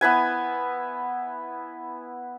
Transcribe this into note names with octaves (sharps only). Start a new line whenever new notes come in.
B3 E4 B4 G#5